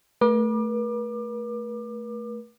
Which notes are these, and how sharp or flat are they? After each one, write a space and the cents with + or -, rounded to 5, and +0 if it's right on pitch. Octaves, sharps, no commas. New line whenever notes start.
A3 +0 B4 -45 D6 +30